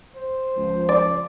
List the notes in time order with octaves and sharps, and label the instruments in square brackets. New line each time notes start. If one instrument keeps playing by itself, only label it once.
[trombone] C5
[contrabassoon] C#2 [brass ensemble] F3
[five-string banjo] D5